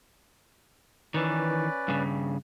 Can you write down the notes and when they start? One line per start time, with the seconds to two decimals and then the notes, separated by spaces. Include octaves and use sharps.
1.14 D#3 E3 C#4 B4 D5
1.88 G2 C#3